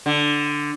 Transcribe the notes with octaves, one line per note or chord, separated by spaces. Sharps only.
D3